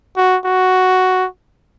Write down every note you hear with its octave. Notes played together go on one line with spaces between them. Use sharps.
F#4
F#4